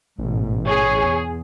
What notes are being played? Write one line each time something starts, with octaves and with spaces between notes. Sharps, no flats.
A1 G#2 B2
G#4 C#5
E2